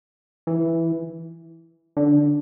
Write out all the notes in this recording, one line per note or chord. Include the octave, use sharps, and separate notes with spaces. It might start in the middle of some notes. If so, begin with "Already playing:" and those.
E3
D3